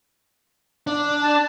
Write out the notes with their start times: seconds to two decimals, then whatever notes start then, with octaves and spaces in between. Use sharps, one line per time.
0.87 D4
1.21 A5